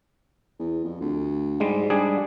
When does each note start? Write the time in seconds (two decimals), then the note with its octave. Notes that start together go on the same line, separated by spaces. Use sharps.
0.60 E2
0.84 F2
1.01 D2
1.60 G#2 G3 G#3
1.90 G3 D4 G#4